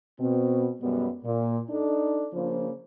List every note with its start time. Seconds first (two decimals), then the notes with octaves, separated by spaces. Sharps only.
0.20 B2 C4
0.81 F#2 B2 G3 G#3 B3
1.25 A#2
1.70 D4 D#4 A4
2.33 C#3 F3 A#3 D4 F4 C5